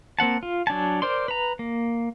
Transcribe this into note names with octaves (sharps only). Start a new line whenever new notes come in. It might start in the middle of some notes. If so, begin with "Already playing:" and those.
A#3 C4 F#5 A5
F4
F#3 D4 G#5 A5
A#4 C5 D5 C6
B4 A#5
A#3